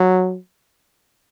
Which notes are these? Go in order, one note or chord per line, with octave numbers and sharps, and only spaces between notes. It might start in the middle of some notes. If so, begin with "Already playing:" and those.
Already playing: F#3